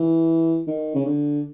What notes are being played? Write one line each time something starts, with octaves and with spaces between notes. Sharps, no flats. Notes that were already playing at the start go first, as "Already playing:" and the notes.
Already playing: E3
D#3
C#3
D3